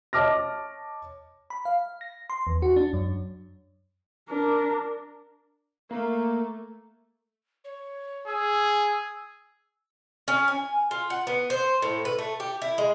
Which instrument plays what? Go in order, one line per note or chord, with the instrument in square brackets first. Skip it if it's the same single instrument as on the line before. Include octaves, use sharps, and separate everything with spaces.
[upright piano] C#5 D#5 A5 D6 F6 A#6
[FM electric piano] B5
F5
A#6
C6
E2
F#4
D4
F#2
[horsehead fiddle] D4 A#4
[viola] A3 [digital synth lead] A#3 [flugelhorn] A#4
[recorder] C#5
[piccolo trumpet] G#4 [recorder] E6
[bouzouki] C#4
G#5
F4
F#5
B3
C5
A2
B4
A3
G4
E4
G#3